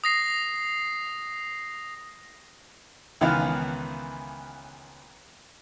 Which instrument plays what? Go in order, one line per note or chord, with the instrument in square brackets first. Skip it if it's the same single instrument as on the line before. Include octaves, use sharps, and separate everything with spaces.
[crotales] D#6 A#6 C7
[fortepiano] C#2 D#3 E3 B3 F5